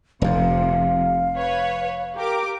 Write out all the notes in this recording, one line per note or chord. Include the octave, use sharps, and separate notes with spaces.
F1 F2 C3 F3 F5
B4 C#5
G4 A#4 D6